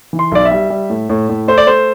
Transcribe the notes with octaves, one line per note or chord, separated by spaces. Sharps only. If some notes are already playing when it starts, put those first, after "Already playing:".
E3
C6
B1 D5
E5
G3
G3
A2
A2
A2
A3 C5
D5
A3 C5